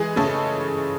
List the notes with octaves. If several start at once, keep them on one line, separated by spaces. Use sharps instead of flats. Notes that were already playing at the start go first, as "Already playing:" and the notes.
Already playing: E3 G#3 G#4
C#3 A3 A4